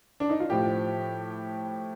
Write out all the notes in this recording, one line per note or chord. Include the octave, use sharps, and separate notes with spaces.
D4
D#4
F4
A2 F3 G4